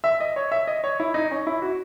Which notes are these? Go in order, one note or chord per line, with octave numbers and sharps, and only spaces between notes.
E5
D#5
C#5
E5
D#5
C#5
E4
D#4
C#4
E4
F#4